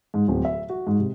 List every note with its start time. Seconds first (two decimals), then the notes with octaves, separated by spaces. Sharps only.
0.14 G#2
0.28 D1
0.45 E5
0.69 F#4
0.87 G#2
0.99 C3